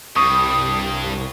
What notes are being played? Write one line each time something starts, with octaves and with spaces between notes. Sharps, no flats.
C2 G2 C#6 D#6